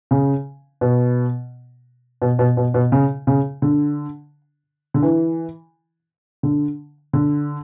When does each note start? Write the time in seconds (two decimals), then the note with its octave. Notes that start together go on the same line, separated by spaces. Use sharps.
0.11 C#3
0.81 B2
2.22 B2
2.39 B2
2.57 B2
2.74 B2
2.92 C#3
3.27 C#3
3.62 D3
4.94 D3
5.02 E3
6.43 D3
7.13 D3